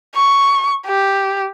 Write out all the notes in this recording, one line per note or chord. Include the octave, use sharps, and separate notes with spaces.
C#6
G4